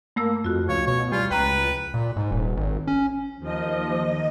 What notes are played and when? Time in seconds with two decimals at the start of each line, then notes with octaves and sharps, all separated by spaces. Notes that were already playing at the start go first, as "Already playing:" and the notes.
0.16 G2 A3 A#3 E6
0.44 F2 F4 F#4
0.69 C#2 F3 C#5
0.87 B2 C#5
1.12 E2 G3 F4
1.31 C#2 B4 G5 A#5 F#6
1.94 A#2
2.17 G#2
2.31 D#1
2.57 G#1
2.87 C#4
3.39 D#2 F3 D#5